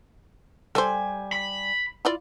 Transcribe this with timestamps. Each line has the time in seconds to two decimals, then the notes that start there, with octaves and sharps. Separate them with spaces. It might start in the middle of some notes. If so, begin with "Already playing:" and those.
0.75 G3 A4 C5 G#5
1.32 B5
2.05 E4 F4 D5